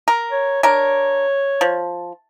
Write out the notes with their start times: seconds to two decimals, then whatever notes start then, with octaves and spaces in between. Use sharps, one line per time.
0.08 A#4
0.31 C#5
0.63 D4 A#4 C#5
1.61 F3